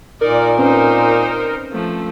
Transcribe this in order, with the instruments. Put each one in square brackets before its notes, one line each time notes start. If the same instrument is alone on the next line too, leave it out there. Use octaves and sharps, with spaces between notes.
[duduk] A#2 [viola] D#4 D5 [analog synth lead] A#4
[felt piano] C4 C#4 B4 [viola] D#4 C5
[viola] F3 A3